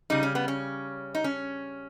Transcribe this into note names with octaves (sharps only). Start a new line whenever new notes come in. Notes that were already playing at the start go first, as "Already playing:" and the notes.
C#3 G3 D#4
C#4
B3
C#4
D#4
C#4